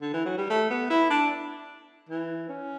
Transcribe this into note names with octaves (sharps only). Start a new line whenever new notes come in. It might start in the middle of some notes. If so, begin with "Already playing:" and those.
D3
E3
F#3
G3
A3
B3
E4
D4
E3
C#4